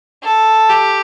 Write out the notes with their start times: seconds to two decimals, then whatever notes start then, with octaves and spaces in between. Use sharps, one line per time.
0.23 A4
0.69 G4